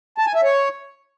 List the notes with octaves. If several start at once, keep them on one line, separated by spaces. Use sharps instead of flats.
A5
G#5
E5
C#5